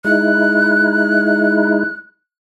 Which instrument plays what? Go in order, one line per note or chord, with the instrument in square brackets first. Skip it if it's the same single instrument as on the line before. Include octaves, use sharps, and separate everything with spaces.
[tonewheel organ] G#3 D#4 E4 [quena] F#6